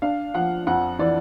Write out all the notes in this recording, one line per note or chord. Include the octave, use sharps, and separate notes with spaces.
D4 F5
F3 F#5
F2 F#5
E3 D5